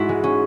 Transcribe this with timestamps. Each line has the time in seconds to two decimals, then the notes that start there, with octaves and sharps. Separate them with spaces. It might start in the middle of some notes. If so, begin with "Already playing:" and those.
Already playing: G#2 E4 F#4
0.09 G#3
0.24 C#4